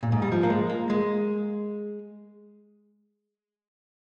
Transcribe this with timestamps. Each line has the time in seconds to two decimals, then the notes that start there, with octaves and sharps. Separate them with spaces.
0.03 A#2
0.12 G#2
0.22 G3
0.32 F3
0.43 A#3
0.50 G#3
0.70 A#3
0.90 G#3